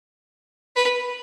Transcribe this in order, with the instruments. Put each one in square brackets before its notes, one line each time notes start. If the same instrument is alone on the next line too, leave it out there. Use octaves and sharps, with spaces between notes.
[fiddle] B4